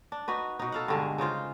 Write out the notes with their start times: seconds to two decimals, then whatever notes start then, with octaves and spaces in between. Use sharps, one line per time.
0.12 D4
0.28 D#4 F#4 B4
0.59 B2 D#4
0.72 A4 F5 F#5
0.88 G2 D3 G#3
1.18 C#3 D#4 F4 C5